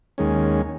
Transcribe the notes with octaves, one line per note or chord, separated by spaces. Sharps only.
D#2 D#3 G#3 C#4